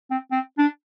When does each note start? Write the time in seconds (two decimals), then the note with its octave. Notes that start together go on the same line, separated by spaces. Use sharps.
0.11 C4
0.31 C4
0.58 D4